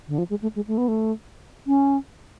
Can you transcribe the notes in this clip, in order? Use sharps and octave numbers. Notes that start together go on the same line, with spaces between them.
D3
F3
G#3
A3
G#3
A3
B3
A3
C#4